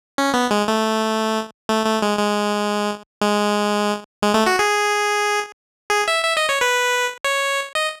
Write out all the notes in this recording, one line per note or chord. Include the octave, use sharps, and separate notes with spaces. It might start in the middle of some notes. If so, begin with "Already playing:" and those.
C#4
B3
G#3
A3
A3
A3
G#3
G#3
G#3
G#3
A3
F#4
G#4
G#4
E5
E5
D#5
C#5
B4
C#5
D#5